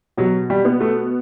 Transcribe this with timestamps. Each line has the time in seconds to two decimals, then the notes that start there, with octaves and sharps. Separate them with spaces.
0.17 B2 F#3
0.50 G3
0.65 B3
0.81 A3